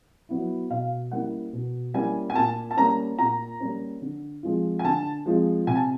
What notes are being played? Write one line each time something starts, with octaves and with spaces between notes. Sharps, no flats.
F#3 B3 E4
B2 F5
G3 A#3 C#4 E4 F#5
B2
G3 A#3 C#4 E4 G#5
G#5
A#2 A5
A5
G3 A#3 C#4 A#5
A#2 A#5
G3 A#3 C#4
D3
F3 G#3 C4 F4
G#5
D3 A5
F3 G#3 C4 F4
C3 G#5
A5